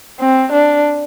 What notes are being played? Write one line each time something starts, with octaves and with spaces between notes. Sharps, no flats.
C4
D4